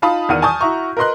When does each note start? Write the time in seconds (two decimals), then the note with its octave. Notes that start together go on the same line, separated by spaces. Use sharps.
0.02 D#4 F4 F5 A5 B5 D#6
0.29 E2 D#3 D5 F#5 F6 D#7
0.42 G#5 A5 C#6 D#6 G6
0.61 E4 F#4 A#5 C#6
0.97 A#4 B4 D#5 C6 F#6